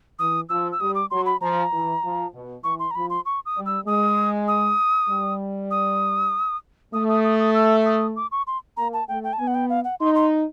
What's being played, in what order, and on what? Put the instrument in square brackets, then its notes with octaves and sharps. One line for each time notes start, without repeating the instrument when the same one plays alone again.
[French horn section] E3 [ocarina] D#6
[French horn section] F3 [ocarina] E6
[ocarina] E6
[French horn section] G3 [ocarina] D#6
[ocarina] D6
[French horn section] F#3 [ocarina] C6
[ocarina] B5
[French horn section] F3 [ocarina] A#5
[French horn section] E3
F3
B2
[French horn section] E3 [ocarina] C#6
[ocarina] C6
A#5
[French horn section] F3 [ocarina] B5
[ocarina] C6
C#6
D#6
[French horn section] G3
[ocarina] E6
[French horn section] G#3 [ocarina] D#6
[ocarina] D#6
[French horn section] G3
[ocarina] D#6
[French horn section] A3 [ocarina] D#6
[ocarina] D#6
D#6
D#6
E6
D#6
D6
C#6
C6
[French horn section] A#3 [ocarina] A#5
[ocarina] A5
[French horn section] A3 [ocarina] G5
[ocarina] G5
A5
[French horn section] B3 [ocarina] G#5
[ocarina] F#5
G5
F5
F#5
[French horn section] D#4 [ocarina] C6
[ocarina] C6